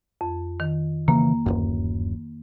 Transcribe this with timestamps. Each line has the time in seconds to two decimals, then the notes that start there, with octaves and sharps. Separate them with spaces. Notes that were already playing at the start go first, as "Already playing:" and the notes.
0.21 F2
0.60 D#3
1.08 C#3 E3 A#3
1.46 D1 G#1 F#2